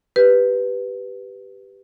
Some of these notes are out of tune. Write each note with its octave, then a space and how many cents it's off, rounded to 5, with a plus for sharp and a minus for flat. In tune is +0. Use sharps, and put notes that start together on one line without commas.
G4 +0 B4 +0